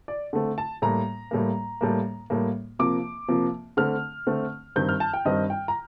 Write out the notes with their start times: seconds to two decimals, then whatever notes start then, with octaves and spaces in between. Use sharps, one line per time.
0.08 D5
0.33 D3 A3 C4
0.58 A5
0.82 A2 G3 A#3 A#5
1.31 A2 G3 A#3
1.81 A2 G3 A#3
2.30 A2 G3 A#3
2.79 C3 F3 A#3 D6
3.29 C3 F3 A#3
3.77 D3 A3 C4 F6
4.27 D3 A3 C4
4.76 G2 D#3 G3 C4 G6
4.89 F6
5.00 A5
5.14 G5
5.25 G2 D#3 G3 C4 D#5
5.50 G5
5.68 A#5